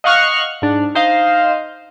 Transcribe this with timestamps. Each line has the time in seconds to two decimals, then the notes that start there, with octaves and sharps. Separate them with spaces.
0.04 D#5 F5 F#5 C#6 F6 F#6
0.62 G#2 D4
0.95 D#4 C5 D#5 F5